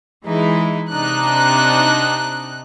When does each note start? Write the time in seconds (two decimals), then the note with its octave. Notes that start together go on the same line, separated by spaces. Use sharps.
0.25 E3 G#3 D#4 E4
0.92 C3 D4 D#4 F#6